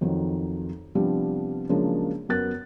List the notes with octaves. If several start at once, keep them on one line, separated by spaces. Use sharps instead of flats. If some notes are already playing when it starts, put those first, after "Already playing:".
F2 D#3 F#3
C3 F3 G3 B3 D4
C#3 F3 F#3 G#3 A#3 D4
F#2 B3 A#4 F#6 A6